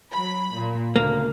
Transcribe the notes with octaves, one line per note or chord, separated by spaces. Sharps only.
F#3 B5
A#2
D2 C#3 A#3